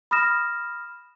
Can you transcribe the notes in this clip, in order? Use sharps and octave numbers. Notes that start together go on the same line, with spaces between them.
B5 D#6 F6 A#6 E7